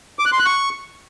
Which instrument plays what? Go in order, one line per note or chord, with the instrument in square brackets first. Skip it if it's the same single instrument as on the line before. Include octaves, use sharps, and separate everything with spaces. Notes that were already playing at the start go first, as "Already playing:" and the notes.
[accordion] D6
F#6
C6
F#6
C#6